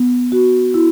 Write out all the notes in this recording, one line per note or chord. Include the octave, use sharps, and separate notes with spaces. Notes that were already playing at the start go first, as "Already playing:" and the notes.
Already playing: B3
F#4
E4